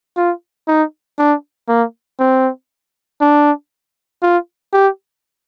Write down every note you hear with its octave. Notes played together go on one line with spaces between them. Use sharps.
F4
D#4
D4
A#3
C4
D4
F4
G4